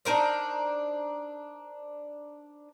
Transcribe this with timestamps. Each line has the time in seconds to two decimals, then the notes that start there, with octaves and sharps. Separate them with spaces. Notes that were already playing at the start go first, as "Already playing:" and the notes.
0.05 D4 D#4 A#4 C5